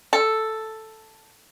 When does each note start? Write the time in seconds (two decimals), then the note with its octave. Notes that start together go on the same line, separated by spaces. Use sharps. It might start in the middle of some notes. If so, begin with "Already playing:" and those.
0.13 A4